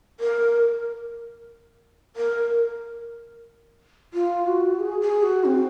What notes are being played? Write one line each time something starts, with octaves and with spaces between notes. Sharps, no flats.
A#4
A#4
F4
F#4
G#4
G#4
F#4
C4